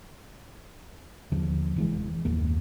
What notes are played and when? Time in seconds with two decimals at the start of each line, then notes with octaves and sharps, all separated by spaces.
1.32 D#2 D3 F3
1.76 F1 E3 G#3
2.25 F#1 D#2 A#3